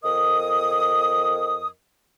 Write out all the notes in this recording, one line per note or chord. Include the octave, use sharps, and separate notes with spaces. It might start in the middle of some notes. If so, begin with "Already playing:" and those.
F2 A#4 D#5 D#6